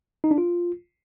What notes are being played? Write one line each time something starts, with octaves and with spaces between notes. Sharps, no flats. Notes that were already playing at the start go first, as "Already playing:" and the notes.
D#4
D4
F4